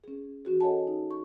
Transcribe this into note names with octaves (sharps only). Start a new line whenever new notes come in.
C#4 G#4
E3 C#4 F#4 G#4
A4 C#5 D#5 F#5 G#5 A5
D#4
C#6